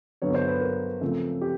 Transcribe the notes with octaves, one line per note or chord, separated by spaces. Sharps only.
G2 D3 F#3 B3 C#5
C5
B4
A#4
C#3 F3 A3 C4
G4